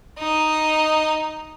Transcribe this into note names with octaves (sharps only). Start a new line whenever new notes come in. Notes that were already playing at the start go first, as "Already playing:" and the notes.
D#4 D#5